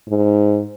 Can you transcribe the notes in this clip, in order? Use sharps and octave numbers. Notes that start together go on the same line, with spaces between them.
G#2